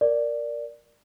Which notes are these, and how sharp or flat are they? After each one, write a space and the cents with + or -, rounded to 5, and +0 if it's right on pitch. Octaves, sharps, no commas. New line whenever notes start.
A#4 +0 D5 +0